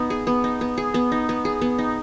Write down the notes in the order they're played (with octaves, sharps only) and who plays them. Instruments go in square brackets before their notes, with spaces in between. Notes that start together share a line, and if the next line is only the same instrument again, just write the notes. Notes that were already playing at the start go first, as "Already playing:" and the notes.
Already playing: [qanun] B3 D#4
G#4
B3
D#4
B3
G#4
B3
D#4
B3
G#4
B3
D#4